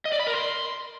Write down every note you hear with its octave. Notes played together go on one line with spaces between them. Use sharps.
D#5
D5
B5
A#4
C6